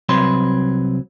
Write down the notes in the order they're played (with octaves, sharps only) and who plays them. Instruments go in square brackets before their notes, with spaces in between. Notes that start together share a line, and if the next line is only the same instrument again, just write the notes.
[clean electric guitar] C2 F#3 C4 B4 C#5 C6